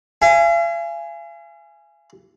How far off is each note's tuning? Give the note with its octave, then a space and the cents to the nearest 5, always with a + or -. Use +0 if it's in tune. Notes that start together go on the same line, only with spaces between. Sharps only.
F5 -45 G#5 +0